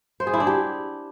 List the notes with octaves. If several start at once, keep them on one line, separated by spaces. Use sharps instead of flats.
C5
G#4
E4
D4
G4